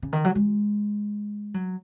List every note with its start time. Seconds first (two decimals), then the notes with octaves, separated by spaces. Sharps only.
0.02 C#3
0.13 D#3
0.25 F#3
0.35 G#3
1.54 F#3